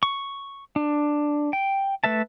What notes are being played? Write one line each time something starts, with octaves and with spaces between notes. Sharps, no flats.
C#6
D4
G5
A3 B4 E5 A5